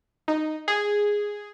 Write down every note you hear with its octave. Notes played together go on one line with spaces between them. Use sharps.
D#4
G#4